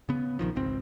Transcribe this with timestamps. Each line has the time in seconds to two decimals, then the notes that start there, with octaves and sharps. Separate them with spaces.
0.09 C#3 B3
0.39 A#1 D#3 F3
0.56 G#1 C#2 C4